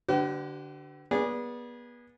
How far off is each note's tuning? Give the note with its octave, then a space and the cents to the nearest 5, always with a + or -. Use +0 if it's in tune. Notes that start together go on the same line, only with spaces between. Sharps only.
D3 +0 G4 -45 B4 +35
B3 -30 G#4 -20 D5 -10